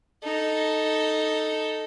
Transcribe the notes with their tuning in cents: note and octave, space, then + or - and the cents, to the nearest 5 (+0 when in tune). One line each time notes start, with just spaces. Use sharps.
D#4 +0 A4 +0